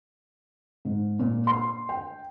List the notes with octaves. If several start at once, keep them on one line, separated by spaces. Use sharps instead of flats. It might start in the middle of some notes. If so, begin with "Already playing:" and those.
G#2
A#2
C6
G5